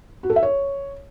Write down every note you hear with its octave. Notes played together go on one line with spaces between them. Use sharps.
F#4
A4
E5
C#5